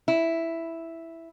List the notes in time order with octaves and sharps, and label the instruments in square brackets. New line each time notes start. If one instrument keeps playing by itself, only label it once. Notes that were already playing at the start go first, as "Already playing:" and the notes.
[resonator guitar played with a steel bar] E4